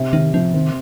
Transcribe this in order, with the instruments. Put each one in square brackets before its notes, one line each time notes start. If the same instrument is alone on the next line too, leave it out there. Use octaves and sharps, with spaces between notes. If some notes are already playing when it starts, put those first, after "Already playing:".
Already playing: [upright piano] C3
[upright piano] C3 [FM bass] D#3
[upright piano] C3 [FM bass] F3
[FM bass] D#3 [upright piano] C4